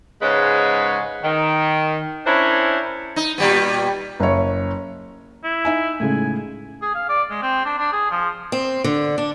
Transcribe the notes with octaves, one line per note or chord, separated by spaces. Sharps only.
G#2 C#3 G#3 B4 C#5
D#3
C#4 D4 E4 A#4 C5 C#5
D#4
A#2 G3 B3
F#1 C#5
E4
D#4 E5 G#5
A2 C#3 G#3 G#5
G#4
F5
D5
G#3
C4
D4
D4
G#4
F3
C4
D3
D4